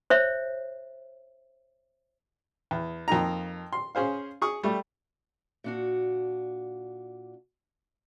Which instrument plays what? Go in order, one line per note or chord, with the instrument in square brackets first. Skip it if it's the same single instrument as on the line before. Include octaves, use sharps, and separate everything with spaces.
[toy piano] C5 C#5 E5
[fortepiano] E2
F2 A#3 D#4 A#5
C6
C#4 G#4 C5 F5
G#4 C#6 D#6
G3 A3
[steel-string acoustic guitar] A#2 D4 F#4